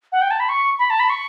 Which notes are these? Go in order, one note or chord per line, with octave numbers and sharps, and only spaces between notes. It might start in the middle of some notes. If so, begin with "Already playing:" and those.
F#5
G5
A5
B5
C#6
B5
A5
B5
C#6